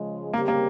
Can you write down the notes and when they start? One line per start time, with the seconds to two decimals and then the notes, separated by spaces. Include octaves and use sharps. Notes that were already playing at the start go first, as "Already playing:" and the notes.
Already playing: C#3 F3 G#3
0.33 C#3 G3 A#3 C4 G4
0.48 A#3